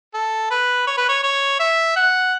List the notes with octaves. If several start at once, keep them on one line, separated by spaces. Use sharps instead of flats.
A4
B4
C#5
B4
C#5
C#5
E5
F#5